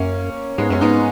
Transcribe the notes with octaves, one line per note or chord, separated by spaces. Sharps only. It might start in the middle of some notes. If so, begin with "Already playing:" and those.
Already playing: F#2 A#3 C#4
G#2 G#3 B3
F#2 C#4
G#2 B3 D#4